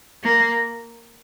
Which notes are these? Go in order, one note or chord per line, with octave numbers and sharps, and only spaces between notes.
A#3